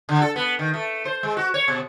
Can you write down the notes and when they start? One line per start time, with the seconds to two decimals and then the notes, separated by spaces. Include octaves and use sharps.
0.09 D3
0.22 A4
0.36 B3
0.59 D#3
0.74 A3
1.05 C5
1.23 G#3
1.37 F#4
1.54 C#5
1.68 B2